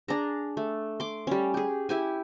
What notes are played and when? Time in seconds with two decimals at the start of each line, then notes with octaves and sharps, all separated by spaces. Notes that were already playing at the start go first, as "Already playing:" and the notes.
0.08 D4 G#4 A#5
0.57 A3
1.00 C6 D6
1.27 G3 C#4
1.54 G4 G#4
1.89 E4 G4 G#5